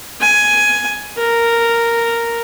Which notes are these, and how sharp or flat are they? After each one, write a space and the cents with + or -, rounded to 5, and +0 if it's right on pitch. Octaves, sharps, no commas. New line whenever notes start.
G#5 +10
A#4 -5